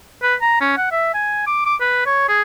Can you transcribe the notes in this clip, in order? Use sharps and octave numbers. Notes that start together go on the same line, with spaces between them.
B4
A#5
C#4
F#5
E5
G#5
D6
D6
B4
C#5
G#4